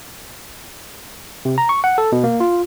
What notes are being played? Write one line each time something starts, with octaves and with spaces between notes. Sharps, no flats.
C3
A#5
C#6
F#5
A4
B2
A#3
F4